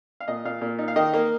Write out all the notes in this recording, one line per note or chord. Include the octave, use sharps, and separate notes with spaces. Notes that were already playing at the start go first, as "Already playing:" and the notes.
F5
A#2 D#5
A#2 F5
A#2
D#4
F5
D#3 D#5
A#3